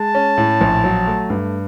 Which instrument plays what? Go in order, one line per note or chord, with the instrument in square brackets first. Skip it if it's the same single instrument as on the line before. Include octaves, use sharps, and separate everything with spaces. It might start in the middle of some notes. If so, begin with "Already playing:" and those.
Already playing: [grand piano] G#3 [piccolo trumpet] A5
[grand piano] C#4
A2
A#1
F#3
A3
G2